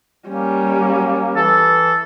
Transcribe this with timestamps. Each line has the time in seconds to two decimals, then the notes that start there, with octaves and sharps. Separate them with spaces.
0.27 G3 A#3 C#4
1.37 E3 A4